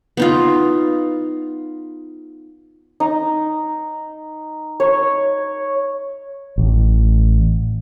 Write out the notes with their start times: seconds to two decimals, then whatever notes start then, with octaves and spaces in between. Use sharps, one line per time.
0.17 B3 D#4 F4
3.00 D#4
4.80 C#5
6.58 A1